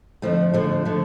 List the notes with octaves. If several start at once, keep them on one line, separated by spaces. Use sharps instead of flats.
F2 D3 F3 A3
F2 D3 F3 A3
D3 F3 A3